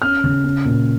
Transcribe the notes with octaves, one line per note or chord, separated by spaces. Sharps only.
C#4 F6
C#3
C#4
A#2